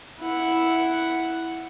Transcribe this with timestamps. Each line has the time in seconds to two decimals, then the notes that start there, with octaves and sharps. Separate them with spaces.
0.21 E4 F#5